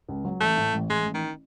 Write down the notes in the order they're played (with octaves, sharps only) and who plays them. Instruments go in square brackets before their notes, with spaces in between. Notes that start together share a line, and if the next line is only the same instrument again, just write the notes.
[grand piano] C#2
F#3
[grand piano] A1 [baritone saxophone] A3
[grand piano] A2
A1
[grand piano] A1 [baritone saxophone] G#3
[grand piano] A1
[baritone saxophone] D#3